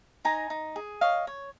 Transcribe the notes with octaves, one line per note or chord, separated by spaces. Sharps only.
D#4 G#5 A#5
D#4
G#4
C#5 D#5 F5
C#5